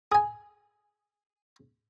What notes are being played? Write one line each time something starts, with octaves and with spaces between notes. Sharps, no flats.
G#4 G#5